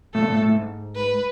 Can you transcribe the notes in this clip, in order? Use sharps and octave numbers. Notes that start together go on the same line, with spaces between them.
A2 A4
A#2
A2
A2
G#2
B4